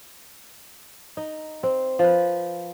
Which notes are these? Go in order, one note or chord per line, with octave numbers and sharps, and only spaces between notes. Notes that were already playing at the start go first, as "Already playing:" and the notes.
D#4
C4
F3 B4